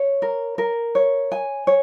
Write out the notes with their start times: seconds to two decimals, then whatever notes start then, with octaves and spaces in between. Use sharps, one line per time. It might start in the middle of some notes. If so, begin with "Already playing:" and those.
Already playing: C#5
0.22 A#4
0.58 A#4
0.95 C#5
1.32 G#5
1.67 C#5